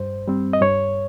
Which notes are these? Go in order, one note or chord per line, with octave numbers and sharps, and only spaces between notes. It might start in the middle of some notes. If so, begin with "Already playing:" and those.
Already playing: G2 C5
G3 C4
D#5
G2 C#5